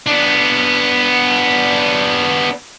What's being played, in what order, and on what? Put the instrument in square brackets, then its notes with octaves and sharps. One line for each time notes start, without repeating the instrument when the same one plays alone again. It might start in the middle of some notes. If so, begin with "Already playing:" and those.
[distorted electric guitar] B3 D4